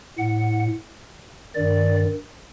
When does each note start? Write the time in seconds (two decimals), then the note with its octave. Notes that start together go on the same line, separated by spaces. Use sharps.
0.18 A2 F#5
1.55 G2 D#3 D5